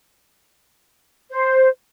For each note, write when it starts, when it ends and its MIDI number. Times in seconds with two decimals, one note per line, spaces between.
1.30 1.68 72